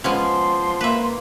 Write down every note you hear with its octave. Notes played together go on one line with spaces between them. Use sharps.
F3 G#3 B3 C#4 C6
A#3 B4 E5